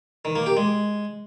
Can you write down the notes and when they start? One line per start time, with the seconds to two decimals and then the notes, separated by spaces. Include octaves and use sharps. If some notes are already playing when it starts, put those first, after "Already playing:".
0.25 D#3
0.36 A#3
0.46 G4
0.57 G#3